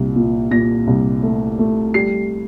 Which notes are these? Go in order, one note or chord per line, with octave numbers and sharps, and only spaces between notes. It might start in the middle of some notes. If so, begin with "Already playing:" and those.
Already playing: C2 A#2
A#2
A#2 A#6
C2
A3
A3
G3 C7